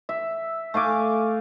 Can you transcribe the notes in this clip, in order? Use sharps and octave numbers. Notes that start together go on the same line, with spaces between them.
E5
A3 F5 G#5 D6